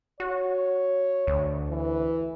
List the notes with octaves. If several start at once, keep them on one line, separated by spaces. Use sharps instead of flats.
F#4 C#5
D2
E3